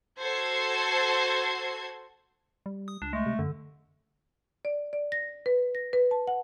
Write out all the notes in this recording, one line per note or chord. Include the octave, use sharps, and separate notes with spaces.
F#4 A4 C5 G#6 C7
G3
D#6
C#2 D4
G#3 A3
C3
F#2 D3
D5
D5
A#6
B4
A#6
B4
A5
F#5